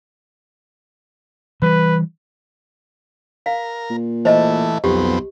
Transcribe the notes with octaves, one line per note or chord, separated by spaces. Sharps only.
E3 G3 B4
A#4 F5
A#2
E3 A3 C5 D#5 A5
B1 F2 B3 C4 G4